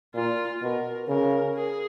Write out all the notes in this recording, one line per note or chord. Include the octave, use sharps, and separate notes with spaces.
A#2 F4
B2 A#4
C#3 A#4
G#4